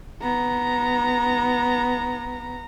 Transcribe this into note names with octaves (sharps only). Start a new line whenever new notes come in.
B3 A#5